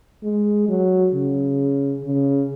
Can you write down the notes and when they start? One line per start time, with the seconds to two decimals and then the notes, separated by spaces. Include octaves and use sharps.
0.23 G#3
0.68 F#3
1.14 C#3
2.04 C#3